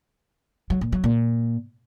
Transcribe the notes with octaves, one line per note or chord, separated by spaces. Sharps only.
F#3
A#2
F#3
A#2